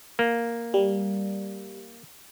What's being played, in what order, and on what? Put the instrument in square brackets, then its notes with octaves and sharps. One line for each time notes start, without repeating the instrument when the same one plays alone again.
[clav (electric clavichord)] A#3
[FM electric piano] G3